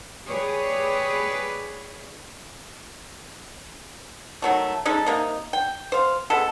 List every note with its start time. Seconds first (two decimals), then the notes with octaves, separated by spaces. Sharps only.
0.26 G4 G#4 B4 C#5 D5
4.42 D#3 F#3 A3
4.85 G#3 C#4 D#4 A4
5.06 C3 A#3 D#4
5.53 G5
5.92 C5 F5
6.30 G#3 B3 A4